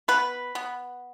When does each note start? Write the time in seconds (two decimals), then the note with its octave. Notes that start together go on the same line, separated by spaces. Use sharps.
0.08 B3 B4
0.55 B3